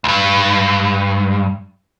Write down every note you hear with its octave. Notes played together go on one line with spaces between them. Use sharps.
C#2 G2